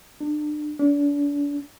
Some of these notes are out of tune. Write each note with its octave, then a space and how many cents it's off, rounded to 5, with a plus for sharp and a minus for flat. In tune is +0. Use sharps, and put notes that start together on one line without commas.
D4 +35
D4 -35